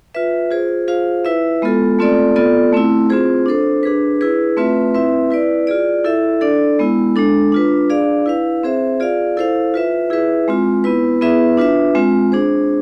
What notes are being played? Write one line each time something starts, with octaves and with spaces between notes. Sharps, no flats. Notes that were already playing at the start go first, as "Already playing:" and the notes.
F4 B4 E5
F4 G#4 C5
F4 G#4 C5 F5
E4 B4 E5
G#3 B3 F4 A4
A3 C4 F4 A4 D5
B3 F4 A4 D5
A3 C4 E4
C4 F4 G#4 C5
D4 A4 C5
D4 G#4 B4
E4 G#4 B4
A3 C4 F4 B4 E5
C4 E4 B4 E5
E4 B4 D5
F4 G#4 D5
E4 A4 E5
D4 A4 D5
G#3 B3 E4
G#3 D4 A4
D4 F4 B4
D4 G#4 D5 F5
E4 B4 F5
C4 G#4 C5 E5
F4 G#4 D5 F5
E4 A4 C5 F5
F4 B4 E5
E4 G#4 B4 E5
G#3 C4 F4
B3 E4 B4
B3 E4 G#4 B4 E5
D4 F4 B4 E5
G#3 C4 F4
D4 G#4 C5